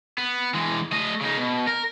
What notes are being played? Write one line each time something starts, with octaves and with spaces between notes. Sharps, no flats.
B3
E3 G#3
A3 D#5
C#3 D#4
B2
A#4